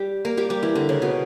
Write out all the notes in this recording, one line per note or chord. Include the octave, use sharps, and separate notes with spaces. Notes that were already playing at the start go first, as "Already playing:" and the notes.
Already playing: G3 G4
A#3 A#4
G3 G4
G3 G4
E3 E4
D3 D4
C#3 C#4
B2 B3